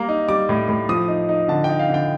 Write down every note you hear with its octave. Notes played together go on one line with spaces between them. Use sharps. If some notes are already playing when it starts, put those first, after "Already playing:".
Already playing: G3 A#3 A#5
D#4
G3 D6
A2
A2
F3 D#6
D#4
D#4
D3 A5
G5
D#4
F5
D3 G5